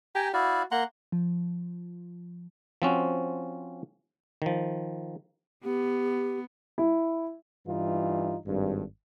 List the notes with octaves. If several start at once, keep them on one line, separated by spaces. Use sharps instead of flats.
G4 G5 G#5 A#5
E4 F#4 D5 F5
A#3 F#5 A#5 C6
F3
F3 C4 C#4 F#4
D#3 F3
B3 G4
E4
G2 E3 D#4 F4
G#1 G2